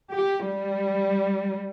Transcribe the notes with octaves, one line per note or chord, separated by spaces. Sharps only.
G4
G3